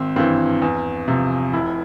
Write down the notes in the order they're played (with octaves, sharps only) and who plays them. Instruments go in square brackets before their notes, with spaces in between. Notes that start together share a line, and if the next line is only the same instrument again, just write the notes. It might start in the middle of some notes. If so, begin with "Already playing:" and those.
Already playing: [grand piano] G#1 C4
G2 E3 C4
E2
C3 F3
F1 E4